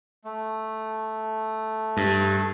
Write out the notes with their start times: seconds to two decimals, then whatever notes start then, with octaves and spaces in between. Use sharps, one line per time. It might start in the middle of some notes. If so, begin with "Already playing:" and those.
0.25 A3
1.97 G2